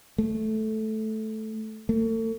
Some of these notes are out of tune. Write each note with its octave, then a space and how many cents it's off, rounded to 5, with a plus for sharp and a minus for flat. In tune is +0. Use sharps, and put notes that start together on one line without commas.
A3 -10
A3 +40